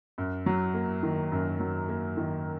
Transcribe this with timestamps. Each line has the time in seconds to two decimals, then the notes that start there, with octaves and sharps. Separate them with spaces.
0.18 F#2
0.46 F#3
0.74 A#3
1.03 D#3
1.32 F#2
1.60 F#3
1.89 A#3
2.17 D#3